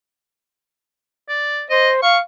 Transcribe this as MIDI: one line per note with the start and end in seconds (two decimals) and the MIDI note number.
1.29 1.63 74
1.70 1.99 72
1.70 1.90 75
2.03 2.20 77
2.03 2.17 85